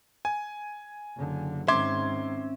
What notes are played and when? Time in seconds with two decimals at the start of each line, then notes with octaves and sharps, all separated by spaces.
0.25 G#5
1.16 F#1 D3
1.68 G#2 D#3 C4 C#4 E5 C6 D6 G#6